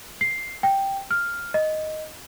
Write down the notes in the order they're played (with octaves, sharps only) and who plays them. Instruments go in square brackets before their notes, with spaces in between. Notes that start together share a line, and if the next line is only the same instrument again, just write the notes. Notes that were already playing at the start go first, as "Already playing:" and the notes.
[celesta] C7
G5
F6
D#5